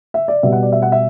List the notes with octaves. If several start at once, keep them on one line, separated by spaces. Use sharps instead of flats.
E5
D5
B2 G3 E5
F#5
D5
E5
F#5
E5